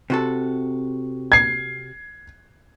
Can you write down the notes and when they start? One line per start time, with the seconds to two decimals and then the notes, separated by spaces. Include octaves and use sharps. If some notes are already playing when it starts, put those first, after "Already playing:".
0.10 C3 F#4 A4
1.32 G#6 C7